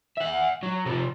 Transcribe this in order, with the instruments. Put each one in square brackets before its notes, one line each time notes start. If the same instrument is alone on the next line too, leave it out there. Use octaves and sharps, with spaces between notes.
[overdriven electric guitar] E5 F#5
F#3
C3 F3